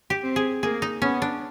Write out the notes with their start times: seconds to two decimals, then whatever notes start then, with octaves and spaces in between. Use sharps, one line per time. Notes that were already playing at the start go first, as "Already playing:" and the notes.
0.10 G4
0.23 C4
0.36 G#4
0.63 A#3 G#4
0.82 D#4
1.02 B3 C#4
1.22 D4